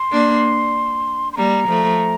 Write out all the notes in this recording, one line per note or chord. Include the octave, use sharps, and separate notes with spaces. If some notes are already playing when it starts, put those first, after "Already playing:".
Already playing: C6
A#3 D4
C6
G3 A#3 A#5
F3 A3